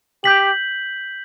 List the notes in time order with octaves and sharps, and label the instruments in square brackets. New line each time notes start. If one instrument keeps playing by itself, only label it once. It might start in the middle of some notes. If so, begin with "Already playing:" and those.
[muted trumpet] G4 [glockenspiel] G6 B6 F#7